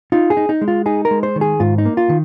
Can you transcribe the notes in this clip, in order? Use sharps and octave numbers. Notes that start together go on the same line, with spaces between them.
D#4 F4
G#4
D#4
D#4
G#3
F4
D#4 G#4
A#4
G#3
C5
D#3
G#4
G#2 F4
D#4
A#3
F4
D#3